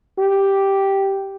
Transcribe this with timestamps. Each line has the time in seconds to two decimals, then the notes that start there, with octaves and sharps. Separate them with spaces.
0.19 G4